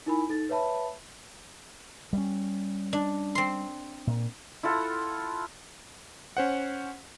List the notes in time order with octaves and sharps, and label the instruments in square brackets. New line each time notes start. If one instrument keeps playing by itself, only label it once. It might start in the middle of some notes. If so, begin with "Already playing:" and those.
[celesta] D#4 E4 A#4 G#5 B5
D#4 A4 A6
B4 C#5 E5 A5 B5
[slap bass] G3 C#4
[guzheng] D4
C4 C6
[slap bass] A#2
[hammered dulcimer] E4 F4 A4 F#5
[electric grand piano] C#4 C5 F#5